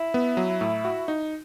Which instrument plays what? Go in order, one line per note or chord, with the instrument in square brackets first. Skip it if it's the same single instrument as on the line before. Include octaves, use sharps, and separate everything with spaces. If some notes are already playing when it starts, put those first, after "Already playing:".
Already playing: [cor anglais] E4
[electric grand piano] B3
F#3
A2
F#4
D#4